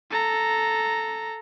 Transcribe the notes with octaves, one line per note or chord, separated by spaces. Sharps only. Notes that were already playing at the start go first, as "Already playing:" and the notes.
A4 A#5